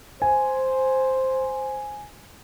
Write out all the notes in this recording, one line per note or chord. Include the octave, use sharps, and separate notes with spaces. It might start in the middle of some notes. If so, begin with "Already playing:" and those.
C5 G#5